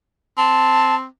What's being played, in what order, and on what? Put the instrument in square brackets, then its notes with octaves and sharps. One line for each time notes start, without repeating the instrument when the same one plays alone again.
[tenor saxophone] C4 [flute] A5